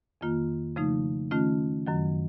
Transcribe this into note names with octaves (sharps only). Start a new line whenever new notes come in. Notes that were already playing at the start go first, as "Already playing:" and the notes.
F2 D#3 A#3 F4
C#3 F3 A3 D#4
D#3 A3 C#4 F4
F#2 D#3 F#3